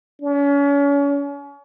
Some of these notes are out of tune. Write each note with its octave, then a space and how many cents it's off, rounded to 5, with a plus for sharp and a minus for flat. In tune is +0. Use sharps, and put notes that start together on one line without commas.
C#4 +35